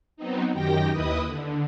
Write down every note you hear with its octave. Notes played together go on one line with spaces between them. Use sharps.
F#3 B3 C4 D#4
F#2 D#3 G4 G5 A#6
D#2 E4 B4 D#5 D#6
D3